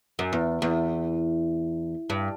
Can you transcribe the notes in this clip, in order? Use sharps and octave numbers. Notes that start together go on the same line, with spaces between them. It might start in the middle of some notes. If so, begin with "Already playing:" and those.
F#2
E2
E2
G2